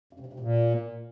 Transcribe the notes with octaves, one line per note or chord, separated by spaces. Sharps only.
F#2
C3
G2
C3
A#2